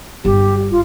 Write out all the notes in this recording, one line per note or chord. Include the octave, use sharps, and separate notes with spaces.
G1 G4
F4